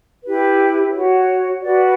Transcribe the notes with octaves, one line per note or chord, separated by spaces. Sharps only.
E4 G4 B4
F#4 C#5
F#4 B4 D5